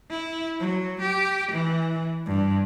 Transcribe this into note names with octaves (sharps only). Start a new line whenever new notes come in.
E4
F#3
G4
E3
G2